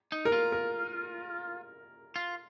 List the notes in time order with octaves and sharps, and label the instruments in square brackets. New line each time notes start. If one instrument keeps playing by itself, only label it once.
[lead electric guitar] D#4
[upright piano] A#4
[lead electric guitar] F4
[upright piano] A#4
[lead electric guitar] F4